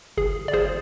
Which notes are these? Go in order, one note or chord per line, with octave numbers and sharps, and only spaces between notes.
G1 G#4
D5
G1 G#4 C5